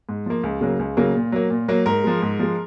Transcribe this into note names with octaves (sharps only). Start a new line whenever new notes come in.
G#2
F3 A#3
C#2
C#3 F#3 A#3
C#2
C#3 F#3 A#3
A#2
F#3 A#3
A#2
F#3 A#3
G#2 A#4
F3 G#3
G#2
F3 G#3